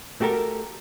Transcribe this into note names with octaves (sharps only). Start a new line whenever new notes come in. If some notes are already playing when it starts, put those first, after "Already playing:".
A3 F#4 G4 A4 A#4